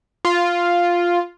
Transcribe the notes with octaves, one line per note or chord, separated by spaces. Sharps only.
F4